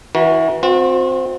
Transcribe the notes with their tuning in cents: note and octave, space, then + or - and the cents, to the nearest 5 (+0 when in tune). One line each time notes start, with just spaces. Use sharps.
E3 -20 F#4 +0 A#4 +35
C4 +0 F#4 -45